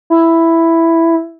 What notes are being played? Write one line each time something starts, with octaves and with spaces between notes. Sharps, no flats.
E4